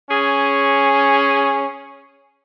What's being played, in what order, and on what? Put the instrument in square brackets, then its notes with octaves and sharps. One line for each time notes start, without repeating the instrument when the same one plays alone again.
[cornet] C#4 [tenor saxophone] G#4